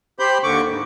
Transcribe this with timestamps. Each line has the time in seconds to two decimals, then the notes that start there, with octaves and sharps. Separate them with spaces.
0.19 G4 C5 B5 G6
0.43 D#2 D3 C#6 D6
0.68 G#2